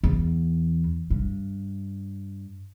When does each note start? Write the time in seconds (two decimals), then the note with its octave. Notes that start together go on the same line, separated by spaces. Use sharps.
0.03 E2
1.10 G2